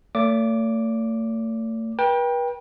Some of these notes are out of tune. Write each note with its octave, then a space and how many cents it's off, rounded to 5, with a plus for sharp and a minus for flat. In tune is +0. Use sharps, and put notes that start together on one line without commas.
A3 +40 D5 -45 D6 +0
B4 -40 G5 +15